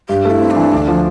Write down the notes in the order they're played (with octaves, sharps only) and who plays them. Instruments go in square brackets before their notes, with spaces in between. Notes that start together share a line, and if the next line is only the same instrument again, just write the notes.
[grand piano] G2 [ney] G4
[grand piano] A3
[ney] E4
[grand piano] C4
[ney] D4
[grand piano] E3
D2
F3